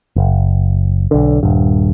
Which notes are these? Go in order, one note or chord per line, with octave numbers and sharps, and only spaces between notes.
F#1
B1 D3
D#1 G2